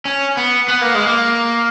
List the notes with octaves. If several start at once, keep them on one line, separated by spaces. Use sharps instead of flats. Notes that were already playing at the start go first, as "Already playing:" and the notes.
C#4
B3
B3
A#3
G#3
A#3